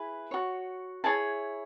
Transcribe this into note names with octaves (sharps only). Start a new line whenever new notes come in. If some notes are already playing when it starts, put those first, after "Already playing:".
Already playing: E4 G#4 B4
F#4 C#5
E4 G#4 C#5 A5